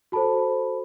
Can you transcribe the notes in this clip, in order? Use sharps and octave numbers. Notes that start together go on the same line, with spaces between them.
F#4 A4 C5 A5 B5